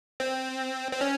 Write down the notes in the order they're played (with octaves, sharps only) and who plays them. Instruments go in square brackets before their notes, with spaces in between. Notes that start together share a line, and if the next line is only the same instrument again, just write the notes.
[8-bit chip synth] C4
C4
C#4